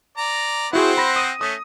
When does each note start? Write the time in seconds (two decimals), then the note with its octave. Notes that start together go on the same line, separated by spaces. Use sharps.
0.17 D5 A#5
0.73 C4 E4 F#4 G#4 C5 F#5
0.98 B5 A#6
1.16 D#6 D#7
1.41 A3 C#4 D#6